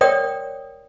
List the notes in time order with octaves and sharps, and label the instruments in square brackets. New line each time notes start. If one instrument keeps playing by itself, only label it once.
[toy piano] A#4 C#5 D5 G5 D#6